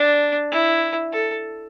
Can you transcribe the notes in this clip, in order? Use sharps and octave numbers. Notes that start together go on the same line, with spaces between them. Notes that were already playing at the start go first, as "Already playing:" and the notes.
Already playing: D4
E4
A4